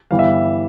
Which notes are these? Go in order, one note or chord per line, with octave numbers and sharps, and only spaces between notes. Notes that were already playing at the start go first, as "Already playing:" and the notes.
G1 E3 G3 F5
E5